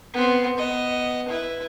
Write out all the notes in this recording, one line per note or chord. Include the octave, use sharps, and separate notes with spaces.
B3 C4
B3 D#5
E4 B4